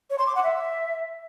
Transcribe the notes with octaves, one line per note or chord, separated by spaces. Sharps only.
C#5
C6
D6
F#5
E5